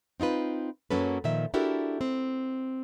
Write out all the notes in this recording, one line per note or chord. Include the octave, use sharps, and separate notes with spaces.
C4 D#4 F4 B4
F#2 F#3 A#3 C#4 A4 B4
A#2 D#3 F3 E5
D4 E4 F#4 G4 A4 A#4
C4